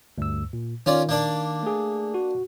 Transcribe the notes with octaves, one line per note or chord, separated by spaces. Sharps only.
D2 G2 E6
A#2
D#3 C#4 F4 D5
A#3 D4 D5
A3 G#4
F#4